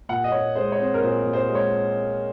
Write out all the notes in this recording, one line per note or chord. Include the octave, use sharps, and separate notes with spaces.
A#2 F#5
D#5
A#2 C#5
G#3 C5
C#5
C4 C5
A#4
A#2 C5
A#2
C5
G#3
C#5